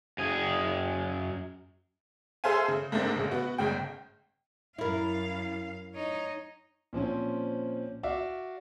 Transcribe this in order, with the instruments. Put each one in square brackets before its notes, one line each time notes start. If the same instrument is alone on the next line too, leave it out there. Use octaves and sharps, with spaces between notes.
[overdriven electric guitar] F#2 G#4
[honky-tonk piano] G#4 A4 C5 E5 F5 G#5
C#3
G#2 A3 A#3 C4 D4
A#1 C#3
B3 F#4
G1 G#2 C#3 G5
[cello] F#2 F5 [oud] E4 A#4
[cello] D#4 C#5
[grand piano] A#2 F3 C4 C#4
F#4 D5 E5 F5